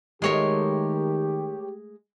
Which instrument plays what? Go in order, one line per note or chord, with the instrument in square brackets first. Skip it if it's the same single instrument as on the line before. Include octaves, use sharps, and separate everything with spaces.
[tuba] D#3 [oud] G#3 A3 F#4 [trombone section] G4 [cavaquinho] A#4 C#5 C6